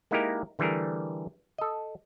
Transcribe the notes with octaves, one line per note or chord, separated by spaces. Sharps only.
G#3 A#3 D#4 E4 G4 A#4
D3 E3 G3 A3 G#4 A#4
A4 D#5